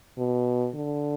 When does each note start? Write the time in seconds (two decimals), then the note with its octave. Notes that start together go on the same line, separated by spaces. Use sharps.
0.18 B2
0.75 D3